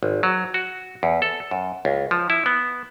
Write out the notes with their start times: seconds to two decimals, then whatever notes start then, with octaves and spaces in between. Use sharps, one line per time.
0.03 G#1
0.23 F#3
0.54 F#4
1.03 E2
1.22 A4
1.51 F#2
1.85 C#2
2.11 F3
2.30 E4
2.46 B3